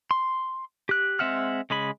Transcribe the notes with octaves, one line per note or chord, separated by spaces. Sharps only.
C6
G4 F#6
G#3 C4 E5 F#5 F6
C#3 G#3 G#4 B5